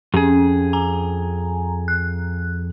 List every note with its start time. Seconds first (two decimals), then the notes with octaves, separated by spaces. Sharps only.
0.14 F2 C#4 G#4
0.73 G#5 A#5
1.88 F#6